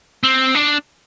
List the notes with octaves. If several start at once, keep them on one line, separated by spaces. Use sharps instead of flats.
C4
D4